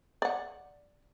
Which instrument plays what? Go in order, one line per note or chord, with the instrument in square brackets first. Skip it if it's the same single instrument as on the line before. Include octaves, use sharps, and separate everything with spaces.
[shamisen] D5 F#5